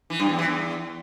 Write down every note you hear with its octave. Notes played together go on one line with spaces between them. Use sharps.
E3
G2
E2
E3
E2